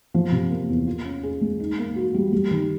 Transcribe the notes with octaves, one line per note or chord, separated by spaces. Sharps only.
F3
C3
A#3
E2
F4
C#4
G#4
G#3
D#4
A#3
F#4
G3
G3
D#3